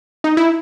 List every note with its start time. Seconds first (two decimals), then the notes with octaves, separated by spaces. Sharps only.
0.24 D#4
0.37 E4